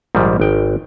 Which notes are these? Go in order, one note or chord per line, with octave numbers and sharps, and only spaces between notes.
A#1 G#2 D#3 G3
G#1 G5